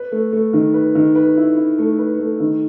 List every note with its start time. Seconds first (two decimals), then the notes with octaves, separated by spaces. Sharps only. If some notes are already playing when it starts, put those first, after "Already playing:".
Already playing: B4
0.12 A3
0.32 A3
0.53 D#3
0.74 B4
0.95 D#3
1.15 B4
1.37 E4
1.56 E4
1.78 A3
1.98 B4
2.19 A3
2.40 D#3